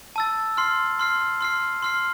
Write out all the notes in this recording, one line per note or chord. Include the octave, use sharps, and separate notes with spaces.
A5 E6 A6
C6 F6 C7
C6 F6 C7
C6 F6 C7
C6 F6 C7